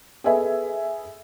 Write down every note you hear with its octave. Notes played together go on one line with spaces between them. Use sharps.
G#4 A4 B4 D#5 E5 G#5